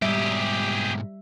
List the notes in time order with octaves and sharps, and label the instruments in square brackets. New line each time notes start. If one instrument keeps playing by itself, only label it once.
[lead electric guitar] G#2 B2 [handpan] G3 E5 [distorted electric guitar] G4 G#4